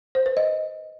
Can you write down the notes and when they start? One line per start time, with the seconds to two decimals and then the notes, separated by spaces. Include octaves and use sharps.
0.15 C5
0.26 B4
0.37 D#5